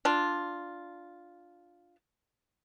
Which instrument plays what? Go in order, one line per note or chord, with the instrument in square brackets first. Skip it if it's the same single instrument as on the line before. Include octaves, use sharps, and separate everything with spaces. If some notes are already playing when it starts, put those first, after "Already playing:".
[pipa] D4 F4